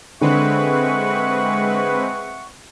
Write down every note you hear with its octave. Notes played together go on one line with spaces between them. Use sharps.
D3 G#3 C4 B4 E5 F#5 C#6